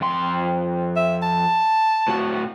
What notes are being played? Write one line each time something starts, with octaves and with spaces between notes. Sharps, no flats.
F2 C6
E5
A5
A2 F#4